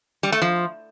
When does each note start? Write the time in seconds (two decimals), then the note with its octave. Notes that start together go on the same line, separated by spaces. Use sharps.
0.23 G3
0.32 A3
0.42 F3